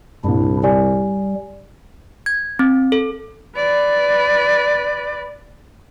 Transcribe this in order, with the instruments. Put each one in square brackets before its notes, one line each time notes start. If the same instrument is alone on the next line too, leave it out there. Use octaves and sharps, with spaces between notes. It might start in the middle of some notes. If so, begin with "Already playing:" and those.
[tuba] C2 [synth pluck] G2 A#2 [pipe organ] D4 E4
[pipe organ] G3 [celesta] G4 D5 G#5
[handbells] G#6
C4
A4
[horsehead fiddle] B4 D5